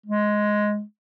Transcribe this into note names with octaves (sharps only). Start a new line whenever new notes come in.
G#3